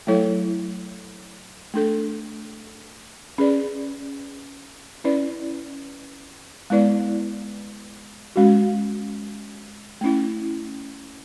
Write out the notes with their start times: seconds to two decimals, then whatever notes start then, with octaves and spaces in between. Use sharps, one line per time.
0.07 F#3 A3 E4 A4 C#5
1.74 A3 D4 A4
3.38 C#4 G#4 B4 D5
5.04 C#4 E4 B4 D5
6.70 G#3 B3 E4 B4 D5
8.36 G#3 C#4 F#4
10.01 A3 C#4 E4